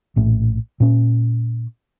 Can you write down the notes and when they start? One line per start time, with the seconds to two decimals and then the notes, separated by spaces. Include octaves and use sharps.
0.16 A#1 A2
0.80 A#2 C#4